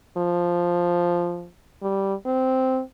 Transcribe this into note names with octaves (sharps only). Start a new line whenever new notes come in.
F3
G3
C4